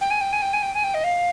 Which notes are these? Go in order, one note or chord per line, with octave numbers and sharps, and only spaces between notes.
G5
G#5
G5
G#5
G5
G#5
G5
G#5
G5
D#5
F5